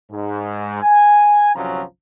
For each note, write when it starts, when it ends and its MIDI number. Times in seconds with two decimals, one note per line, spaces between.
0.11 0.79 44
0.82 1.53 80
1.55 1.82 31
1.55 1.82 36
1.55 1.82 53
1.55 1.82 54
1.55 1.82 61
1.55 1.82 82